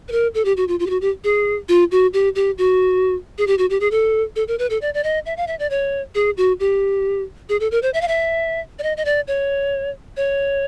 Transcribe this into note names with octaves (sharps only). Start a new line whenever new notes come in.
B4
A#4
A4
G4
F#4
F4
F4
G4
F#4
G4
G#4
F4
F#4
G4
G4
F#4
G#4
G4
F#4
G4
G#4
A4
A4
A#4
B4
A4
D5
D5
D#5
E5
F5
E5
D5
C#5
G#4
F#4
G4
G#4
A4
A#4
C5
E5
F5
E5
D5
D#5
D#5
D5
C#5
C#5